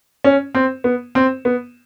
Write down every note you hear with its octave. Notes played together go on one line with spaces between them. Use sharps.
C#4
C4
B3
C4
B3